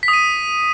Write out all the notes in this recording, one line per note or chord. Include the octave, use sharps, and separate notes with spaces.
B6
D#6
D#7